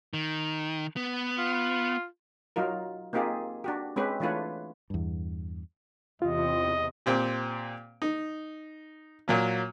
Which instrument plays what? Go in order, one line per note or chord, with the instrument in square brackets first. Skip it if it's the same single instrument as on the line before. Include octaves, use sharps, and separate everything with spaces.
[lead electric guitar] D#3
B3
[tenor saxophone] F4
[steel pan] F#3 D#4 F4 A#4
A#3 C4 D#4 F4 G4 G#4
D4 F#4 G4
G#3 C4 C#4 G4 B4
E3 A3 D4 F4 B4 C#5
[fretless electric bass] E2 G2
[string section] E2 C3 [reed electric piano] F4 [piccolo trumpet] D#5
[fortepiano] A#2 C4 G4
D#4
A#2 F#3 A#3